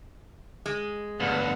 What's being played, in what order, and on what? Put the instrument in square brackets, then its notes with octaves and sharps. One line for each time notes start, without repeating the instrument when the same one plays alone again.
[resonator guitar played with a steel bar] G#3
[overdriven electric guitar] D2 G2 [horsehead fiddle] B3 F#5